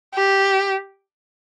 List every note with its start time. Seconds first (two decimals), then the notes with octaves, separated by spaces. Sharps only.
0.14 G4